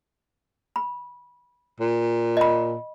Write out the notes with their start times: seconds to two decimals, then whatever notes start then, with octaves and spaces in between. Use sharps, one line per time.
0.76 B5
1.80 A#2
2.37 D#5 B5